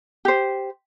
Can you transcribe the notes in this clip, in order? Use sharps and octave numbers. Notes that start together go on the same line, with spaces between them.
G4 C5